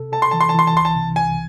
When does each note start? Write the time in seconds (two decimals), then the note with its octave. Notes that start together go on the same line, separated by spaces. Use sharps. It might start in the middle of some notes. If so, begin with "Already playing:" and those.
Already playing: C3 A4
0.12 A4 A5
0.22 C6
0.31 E3 A5
0.41 C6
0.49 A5
0.54 E3 C6
0.67 A5
0.74 C2 C6
0.85 A5
0.95 C3
1.16 C2 G#5